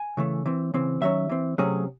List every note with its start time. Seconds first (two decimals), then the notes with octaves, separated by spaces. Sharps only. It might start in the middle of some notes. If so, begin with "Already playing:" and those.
Already playing: G#5
0.17 C#3 E3 A3
0.46 E3 C4
0.74 C#3 E3 C4
1.01 D#3 F#3 C#4 E5
1.29 E3 C4
1.58 C3 F#3 A3 C#4 G#4